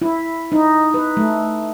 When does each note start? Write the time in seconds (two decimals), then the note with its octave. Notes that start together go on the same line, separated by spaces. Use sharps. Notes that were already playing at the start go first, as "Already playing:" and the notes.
0.02 E4
0.52 D#4
0.94 B4
1.17 A3